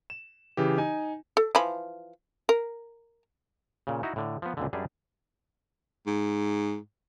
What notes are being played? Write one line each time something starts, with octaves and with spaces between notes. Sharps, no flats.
E7
C#3 E3 G4
D#4 G#5
A4
E3 F3 B5
A#4
A#2 C#3
D#4 E4 F#4
A2 D3
F3 B3
C#2 A#2 D3
F#2 G3 D4 G#4
G#2